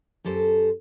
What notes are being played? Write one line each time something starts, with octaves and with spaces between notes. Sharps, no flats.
F#2 G4 A4 C5